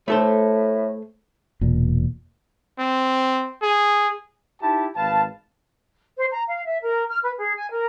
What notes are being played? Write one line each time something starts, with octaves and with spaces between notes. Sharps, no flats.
A2 A3 A4 C5
E1 A#2
C4
G#4
D#4 E4 G4 A5
G#1 B4 F5 A5
C5
A#5
F5
E5
A#4
F6
B4
G#4
G#5
A#4